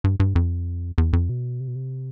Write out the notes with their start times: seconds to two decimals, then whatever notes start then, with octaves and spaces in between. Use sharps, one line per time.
0.04 G2
0.20 G2
0.35 F2
0.98 E2
1.13 F2
1.29 B2
1.60 C3
1.68 B2
1.76 C3